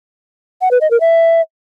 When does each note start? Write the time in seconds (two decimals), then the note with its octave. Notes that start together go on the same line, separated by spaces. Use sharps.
0.61 F#5
0.71 B4
0.81 D#5
0.91 A#4
1.01 E5